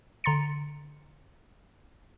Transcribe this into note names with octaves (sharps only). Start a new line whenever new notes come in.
D3 A#5 C6 A6 C#7